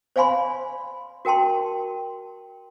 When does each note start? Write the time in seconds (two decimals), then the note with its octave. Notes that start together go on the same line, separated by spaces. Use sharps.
0.16 C5 D5 F5 G#5 B5 C6
1.25 F#4 A#4 G5 A5 C6